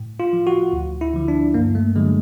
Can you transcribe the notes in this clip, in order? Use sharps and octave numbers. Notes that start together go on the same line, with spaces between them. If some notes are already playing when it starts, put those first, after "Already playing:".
Already playing: A2
F4
F3
F#4
D2
E4
D3 F3
D4
G2 A#3
A3
D3 F#3 G#3